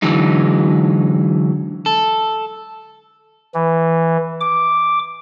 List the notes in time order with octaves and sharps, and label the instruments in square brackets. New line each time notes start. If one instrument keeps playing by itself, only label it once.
[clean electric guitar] D3 E3 F#3 G#3 D#4
A4
[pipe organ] E3
D6